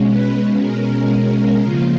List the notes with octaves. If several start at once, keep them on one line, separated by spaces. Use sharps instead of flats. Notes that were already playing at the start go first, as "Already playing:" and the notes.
Already playing: B2 G#3 C#4
B4
A#4
C#3 F3 A#3 F4